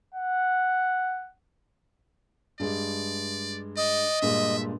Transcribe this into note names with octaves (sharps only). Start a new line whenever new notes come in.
F#5
G2 G#3 D5
D5 D#5
G2 A#2 G#3 E5